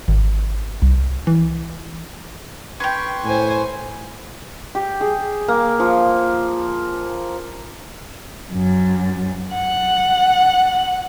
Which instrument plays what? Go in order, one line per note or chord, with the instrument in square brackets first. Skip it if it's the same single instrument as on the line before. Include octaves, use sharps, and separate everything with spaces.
[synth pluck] G#1
C2
E3
[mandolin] C#4 G5 [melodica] B4 C6 C#6
[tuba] A2 [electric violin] C5 G#5
[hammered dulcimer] G4
G#4
A#3
F3
[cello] F#2
F#5